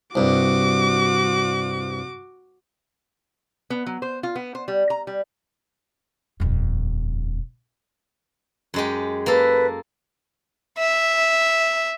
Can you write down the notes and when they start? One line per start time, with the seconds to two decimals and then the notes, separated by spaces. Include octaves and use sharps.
0.15 C2 G2 F#4 D6
3.70 B3
3.86 F#3
4.02 C5
4.23 F4
4.36 B3
4.55 C5
4.68 G3
4.90 A#5
5.07 G3
6.40 D#1 F2
8.74 F#2 G#3 G4
9.26 A#3 A4 B4
10.78 E5